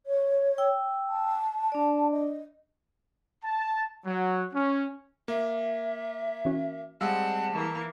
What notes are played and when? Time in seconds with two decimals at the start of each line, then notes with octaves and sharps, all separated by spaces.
0.06 C#5
0.58 G5 E6
1.08 A5
1.72 D4 D5
2.11 D#5
3.44 A5
4.05 F#3
4.54 C#4
5.28 A#3 E5
6.45 E3 C#4 F#4
7.01 G3 G#3 C4 F5 F#5 A5 E6
7.51 E3 A#3